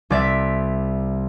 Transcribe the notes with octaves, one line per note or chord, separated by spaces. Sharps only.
C2 D5 E5 B6